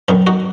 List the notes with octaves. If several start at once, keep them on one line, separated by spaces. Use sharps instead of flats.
F#2 D#3 B3 D#4
D#4 F#4